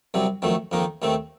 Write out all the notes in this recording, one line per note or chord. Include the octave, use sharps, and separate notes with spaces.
C2 C3 F#3 C4
F2 D#3 F#3 A3
F2 D#3 A#3 D#4
D#2 D#3 A3 C4